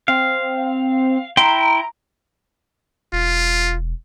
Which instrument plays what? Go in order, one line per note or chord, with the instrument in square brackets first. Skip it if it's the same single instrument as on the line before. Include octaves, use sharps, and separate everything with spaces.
[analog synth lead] C4 [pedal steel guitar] F5
[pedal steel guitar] E4 G5 C6 [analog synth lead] A#5
[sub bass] E1 [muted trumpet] F4